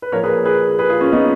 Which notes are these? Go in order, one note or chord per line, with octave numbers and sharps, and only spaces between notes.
B4
A#2 F3 A#3 A#4 C#5
G#4 B4
G#4 B4
G#4 B4
F4 G#4
C#4 F4
B3 D#4